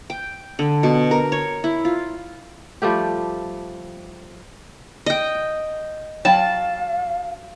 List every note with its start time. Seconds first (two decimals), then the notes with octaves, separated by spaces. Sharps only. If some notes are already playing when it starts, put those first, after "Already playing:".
0.10 G5
0.59 D3
0.83 B2
1.11 A#4
1.32 C#5
1.64 E4
1.85 F4
2.82 F3 G3 A3 G4
5.06 D#5 G5
6.25 F#3 F5 G5 A5 B5